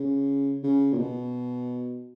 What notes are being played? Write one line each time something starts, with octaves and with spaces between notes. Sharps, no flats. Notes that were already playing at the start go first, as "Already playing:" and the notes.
Already playing: C#3
C#3
A#2
B2